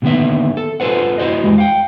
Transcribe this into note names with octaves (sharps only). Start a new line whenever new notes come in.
A#2 D3 D#3 A#3 B3 E5
A4
F4 A4 B4 C5 F#5
E4 F#4 C5 D#5
E2 G#3 G4 A#4
F5 G5